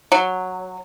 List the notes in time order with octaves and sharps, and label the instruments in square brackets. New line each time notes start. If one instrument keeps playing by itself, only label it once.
[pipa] F#3